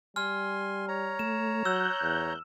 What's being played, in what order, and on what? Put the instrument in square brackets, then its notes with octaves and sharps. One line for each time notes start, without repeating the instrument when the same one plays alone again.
[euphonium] G3 [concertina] G#5 C6 [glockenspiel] F6
[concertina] C#5 A#5
[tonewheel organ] A3 [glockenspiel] E7
[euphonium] F#3 [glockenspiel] E6 [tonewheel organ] F#6 G6
[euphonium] E2